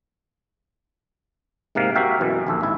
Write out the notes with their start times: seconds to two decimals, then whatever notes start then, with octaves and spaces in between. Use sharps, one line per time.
1.75 G#2 C3 A#3 F5
1.95 F#4 G4 A#4 E5 F5 G5
2.21 F#2 B2 E3
2.47 A#1 D#2 A4
2.61 G#1 E4